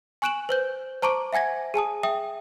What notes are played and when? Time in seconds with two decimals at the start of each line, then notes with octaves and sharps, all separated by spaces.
0.22 G#5 C#6 F#6 D7 E7 F#7
0.49 B4 C5 G6
1.02 C5 A5 A#5 C#6 D6 D7
1.33 E5 F#5 G#5 G#6 A#6
1.74 G#4 G#5 A5 D#6
2.03 E5 G5 D#6